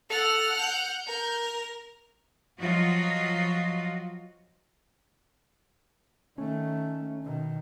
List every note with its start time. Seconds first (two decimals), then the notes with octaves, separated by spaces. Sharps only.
0.10 A4 F#5 F6
0.59 G6
1.06 A#4
2.60 F3 F#3 F4 F#4 D#5
6.38 D#3 A3 C#4
7.24 B2 D#3